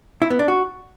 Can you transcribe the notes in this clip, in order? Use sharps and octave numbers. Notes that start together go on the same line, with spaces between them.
E4
B3
D4
F#4